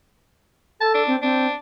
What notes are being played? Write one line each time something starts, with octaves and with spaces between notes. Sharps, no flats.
A4 A5
D4
C4
C4 D4